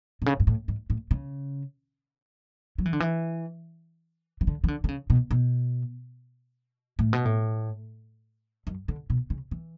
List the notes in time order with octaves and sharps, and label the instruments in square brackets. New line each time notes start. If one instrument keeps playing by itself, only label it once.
[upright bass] B2
C#3
G#2
A2
G#2
A2
C#3
F#3
E3
D3
E3
E3
D3
E3
D3
D3
C#3
B2
B2
A2
B2
A2
F#2
D3
B2
C#3
E3